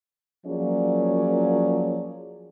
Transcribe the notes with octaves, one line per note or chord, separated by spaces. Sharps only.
F3 F#3 A#3 C#4 G#4 D5